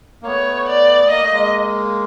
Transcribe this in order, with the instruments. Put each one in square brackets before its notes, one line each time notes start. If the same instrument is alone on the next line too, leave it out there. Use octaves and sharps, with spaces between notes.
[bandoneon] A#3
[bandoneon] A3 B3 [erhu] C#5
[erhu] D5
[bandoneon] A#3 [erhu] D#5
[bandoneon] A3
G#3 A#3